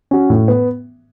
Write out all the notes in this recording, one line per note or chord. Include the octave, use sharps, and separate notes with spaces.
C#4 F#4
A2
B3